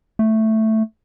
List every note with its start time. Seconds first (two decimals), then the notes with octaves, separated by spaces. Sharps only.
0.19 A3